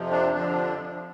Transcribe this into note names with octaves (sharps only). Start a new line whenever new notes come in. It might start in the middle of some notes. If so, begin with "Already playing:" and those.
Already playing: F2 C3 F3
D4
F2 D3 F3 D4